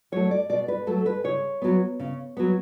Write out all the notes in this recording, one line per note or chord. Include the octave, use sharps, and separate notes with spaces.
F#3 A3 C#5
D5
B2 D5
B4
F#3 A3 A4
B4
C#3 C#5
F#3 B3
C#3
F#3 B3